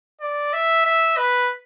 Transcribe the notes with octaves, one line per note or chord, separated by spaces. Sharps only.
D5
E5
E5
B4